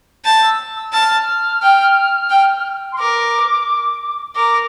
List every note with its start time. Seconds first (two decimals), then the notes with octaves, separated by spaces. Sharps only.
0.25 A5 G6
0.42 E6
0.77 E6
0.93 A5 F6
1.62 G5
2.30 G5
2.92 C6
2.99 A#4 D6
4.35 A#4 D6